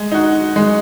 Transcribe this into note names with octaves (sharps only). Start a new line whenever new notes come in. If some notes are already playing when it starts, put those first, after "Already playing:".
Already playing: G#3
D#4 F#4
G#3